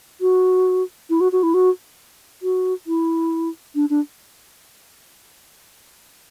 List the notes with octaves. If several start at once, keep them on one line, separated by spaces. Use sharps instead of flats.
F#4
E4
F#4
F#4
E4
F#4
F#4
E4
D4
D4